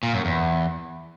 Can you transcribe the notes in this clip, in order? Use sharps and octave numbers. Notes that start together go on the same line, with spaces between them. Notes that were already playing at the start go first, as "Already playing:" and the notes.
A#2
F#2
E2